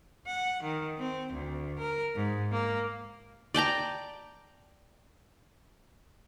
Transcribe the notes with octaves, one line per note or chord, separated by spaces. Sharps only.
F#5
D#3
C4
D2
A#4
G#2
A#3
D5 G5 A5 A#5